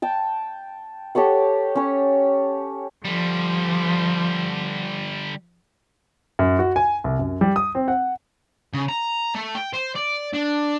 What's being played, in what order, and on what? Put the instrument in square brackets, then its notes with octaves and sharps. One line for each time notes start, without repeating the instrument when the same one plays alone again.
[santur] G5 A5
G4 A4 C#5 F#5
C#4 C#5
[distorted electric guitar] D3 G3 [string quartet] F3
[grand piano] F#2
F#4
G#5
C2
F#2
G3
D#6
C4
F#5
[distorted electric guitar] C#3
A#5
A3
G5
C5
D5
D4